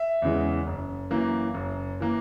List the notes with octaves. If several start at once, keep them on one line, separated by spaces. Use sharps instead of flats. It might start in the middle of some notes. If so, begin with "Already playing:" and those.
Already playing: E5
E2 C#3 E3 G#3
F#1
F#2 E3 A#3
F#1
E3 A#3